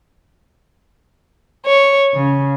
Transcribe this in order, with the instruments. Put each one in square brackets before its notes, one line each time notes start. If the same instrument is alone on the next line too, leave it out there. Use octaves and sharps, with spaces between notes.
[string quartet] C#5
C#3